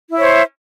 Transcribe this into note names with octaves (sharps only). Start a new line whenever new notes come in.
E4 C5 C#5 E5